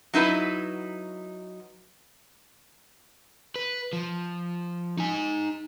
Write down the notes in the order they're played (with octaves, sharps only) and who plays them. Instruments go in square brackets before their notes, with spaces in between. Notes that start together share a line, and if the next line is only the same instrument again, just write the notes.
[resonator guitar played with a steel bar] F#3 D#4 E4 B4
[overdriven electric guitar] B4
F3
D#4 G#5